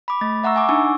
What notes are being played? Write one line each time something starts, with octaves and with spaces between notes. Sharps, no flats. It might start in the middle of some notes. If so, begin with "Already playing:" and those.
B5 D6
A3 A6
E5 F#5 A#5 C#6 E6
F#5 G#5 C#6 D6
D4 D#4 G#5 C#6 E6